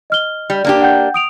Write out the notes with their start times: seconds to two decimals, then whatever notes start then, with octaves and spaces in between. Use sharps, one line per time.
0.10 D#5 F6 G7
0.50 G3
0.65 A#3 D4 G4
0.82 F#5 G5 G6
1.14 D#6 D7 F7